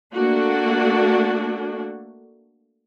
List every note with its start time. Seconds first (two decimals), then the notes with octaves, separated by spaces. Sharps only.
0.14 A3 A#3 D4 F#4